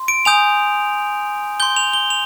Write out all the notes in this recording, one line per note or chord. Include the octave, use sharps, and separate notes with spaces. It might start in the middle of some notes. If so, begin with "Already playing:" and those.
Already playing: C6
D7
G#5 D#6 G6 F7
C6 G6 G7
F7
G7
F7